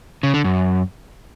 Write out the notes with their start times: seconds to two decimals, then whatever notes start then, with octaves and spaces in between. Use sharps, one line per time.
0.23 C#3
0.34 D3
0.44 F#2